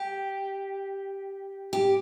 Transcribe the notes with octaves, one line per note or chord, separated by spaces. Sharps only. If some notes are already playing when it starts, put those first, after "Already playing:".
Already playing: G4
G4